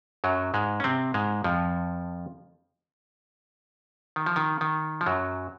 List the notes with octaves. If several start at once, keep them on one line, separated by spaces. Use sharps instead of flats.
F#2 F#3
G#2 G#3
C#4
C3 C4
G#2 G#3
F2 F3
D#3
F3
D#3
D#3
F3
F#2 F#3